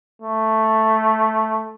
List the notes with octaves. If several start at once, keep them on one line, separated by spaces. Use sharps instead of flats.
A3